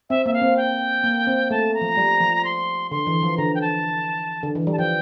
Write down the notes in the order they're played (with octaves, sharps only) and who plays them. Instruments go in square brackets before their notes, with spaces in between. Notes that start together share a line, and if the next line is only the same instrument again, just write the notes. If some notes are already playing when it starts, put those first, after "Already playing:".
[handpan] C4 [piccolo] E5
[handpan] A#3 [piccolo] E5
[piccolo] F5
[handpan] C4
[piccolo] G5
[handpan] A#3
C4
[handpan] A3 [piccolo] A5
[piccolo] A#5
[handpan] F3
G3
F3
[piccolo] C6
[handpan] D3 [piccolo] C6
[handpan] E3
F3
[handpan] D3 [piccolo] A#5
[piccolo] G5
A5
[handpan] D3
E3
G3
[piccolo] A5
[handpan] F3 [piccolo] G5